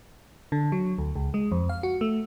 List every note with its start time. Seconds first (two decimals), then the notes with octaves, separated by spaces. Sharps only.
0.52 D3
0.72 F#3
0.98 D2
1.16 C#2
1.34 G#3
1.52 F2
1.69 F5
1.83 F#4
2.01 A3